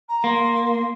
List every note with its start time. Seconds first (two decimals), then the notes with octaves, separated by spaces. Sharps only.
0.08 A#5
0.24 A#3 C6